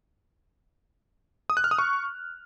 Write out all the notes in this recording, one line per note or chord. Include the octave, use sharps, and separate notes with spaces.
D#6
F#6
F6
D#6
C#6